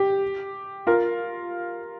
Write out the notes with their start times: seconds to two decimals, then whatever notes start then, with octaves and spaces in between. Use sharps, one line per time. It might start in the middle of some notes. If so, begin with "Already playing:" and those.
Already playing: G4
0.87 F4 A#4